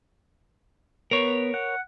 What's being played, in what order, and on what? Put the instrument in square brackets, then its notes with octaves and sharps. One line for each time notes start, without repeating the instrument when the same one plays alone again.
[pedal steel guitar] B3 [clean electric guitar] A#4 C#5
[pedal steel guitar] F#5